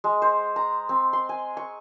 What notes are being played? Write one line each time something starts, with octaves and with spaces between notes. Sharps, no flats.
G#3
C5
A#5
C4
C6
G#5
C#6